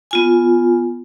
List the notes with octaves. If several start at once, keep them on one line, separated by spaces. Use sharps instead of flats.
B3 F4 G#5